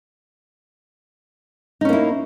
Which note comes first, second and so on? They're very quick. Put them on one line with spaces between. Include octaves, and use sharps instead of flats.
D#4 C#4 A#3 E4